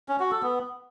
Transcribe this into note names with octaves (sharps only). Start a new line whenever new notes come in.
C#4
F#4
A4
B3